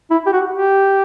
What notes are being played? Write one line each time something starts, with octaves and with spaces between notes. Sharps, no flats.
E4
G4
F#4
G4